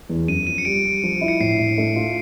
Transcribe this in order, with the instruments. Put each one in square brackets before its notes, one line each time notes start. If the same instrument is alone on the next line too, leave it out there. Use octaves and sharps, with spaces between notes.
[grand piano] E2
[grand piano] F#2 [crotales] D#7
[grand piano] F3 [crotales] D#7
[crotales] C#7
[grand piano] G3 [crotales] D7
[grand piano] G3
F3
E4
[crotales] C#7
[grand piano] A2 [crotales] C7
[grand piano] A2
A3
F4